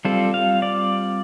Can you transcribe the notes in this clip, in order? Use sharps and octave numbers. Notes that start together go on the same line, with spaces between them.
G3 C4 F4 A4
F5
D5